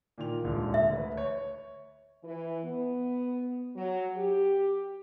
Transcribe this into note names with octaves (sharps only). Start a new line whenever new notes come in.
A#2 D#3 F7
D#1 G#2 D3
E5
D2 B4
C#5
E3
B3
F#3
G4